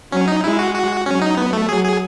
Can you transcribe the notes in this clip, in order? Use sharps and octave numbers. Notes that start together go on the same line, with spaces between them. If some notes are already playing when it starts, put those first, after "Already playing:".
F#3 C#4
D#4
G#3 E4
F#4
F#4
F#3 C#4
D#4
B3
A3
F#3 G#4
G#4